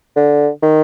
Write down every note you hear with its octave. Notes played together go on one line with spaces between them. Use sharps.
D3
D#3